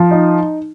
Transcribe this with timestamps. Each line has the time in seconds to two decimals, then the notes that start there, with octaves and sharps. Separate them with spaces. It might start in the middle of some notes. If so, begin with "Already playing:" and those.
Already playing: F3
0.11 D#4